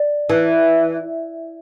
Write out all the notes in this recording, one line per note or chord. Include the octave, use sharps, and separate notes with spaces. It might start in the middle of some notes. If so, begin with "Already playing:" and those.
Already playing: D5
E3